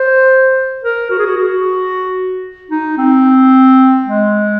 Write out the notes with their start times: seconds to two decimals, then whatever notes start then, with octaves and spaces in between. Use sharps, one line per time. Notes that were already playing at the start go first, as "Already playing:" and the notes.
Already playing: C5
0.84 A#4
1.11 F#4
1.19 G#4
1.26 F#4
1.37 F#4
2.71 D#4
2.98 C4
4.04 G#3